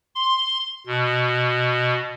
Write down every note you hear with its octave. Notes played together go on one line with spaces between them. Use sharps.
C6
B2